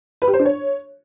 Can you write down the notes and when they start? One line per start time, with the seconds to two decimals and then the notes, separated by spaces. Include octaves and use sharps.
0.22 B4
0.28 G4
0.34 C5
0.39 D4
0.45 C#5